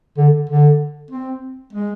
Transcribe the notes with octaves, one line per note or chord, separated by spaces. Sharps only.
D3
D3
C4
G#3